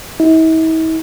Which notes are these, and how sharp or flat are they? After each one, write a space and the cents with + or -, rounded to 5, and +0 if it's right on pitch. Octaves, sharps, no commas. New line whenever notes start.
E4 -45